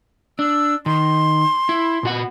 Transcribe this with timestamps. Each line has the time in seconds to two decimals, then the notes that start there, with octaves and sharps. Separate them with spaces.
0.39 D4 E6
0.86 D#3 C6
1.69 E4
2.03 A#2 F#4 F#5